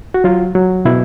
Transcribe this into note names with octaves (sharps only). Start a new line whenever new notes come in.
F#4
F#3 F4
F#3
B2 E4